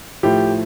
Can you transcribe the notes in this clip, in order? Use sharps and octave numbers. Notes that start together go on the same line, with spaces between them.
A2 F3 G4